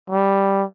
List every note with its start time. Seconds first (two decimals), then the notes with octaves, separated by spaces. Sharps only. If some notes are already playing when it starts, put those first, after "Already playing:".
0.10 G3